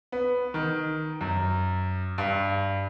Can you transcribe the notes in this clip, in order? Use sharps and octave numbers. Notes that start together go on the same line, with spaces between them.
B3
D#3
F#2
G2